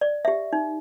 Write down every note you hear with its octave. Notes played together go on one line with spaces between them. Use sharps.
D5
G4 E5
D#4